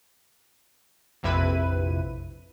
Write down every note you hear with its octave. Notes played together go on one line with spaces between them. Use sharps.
A#1 F2 C3 E4 B4 D#7